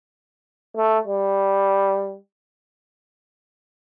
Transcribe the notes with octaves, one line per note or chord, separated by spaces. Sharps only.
A3
G3